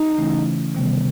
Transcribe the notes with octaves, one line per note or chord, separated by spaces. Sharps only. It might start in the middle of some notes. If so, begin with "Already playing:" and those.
Already playing: D#4
C#3 E3 A3 C#4 E4
C3 D#3 G3 B3